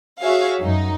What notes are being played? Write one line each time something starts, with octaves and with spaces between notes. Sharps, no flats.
F#4 G#4 C#5 E5 F5
F#2 F#3 D#4